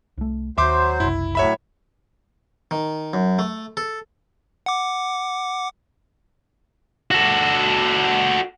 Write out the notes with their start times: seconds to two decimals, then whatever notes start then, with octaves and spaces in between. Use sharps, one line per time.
0.18 C2 A3
0.58 D#2 F#3 C5 E5 C6 D6
1.00 F#1 C2 E4
1.35 A2 F#3 C#5 E5 B5
2.71 D#3
3.14 F#2
3.39 A3
3.77 A4
4.66 F#5 D6
7.11 F#4 A4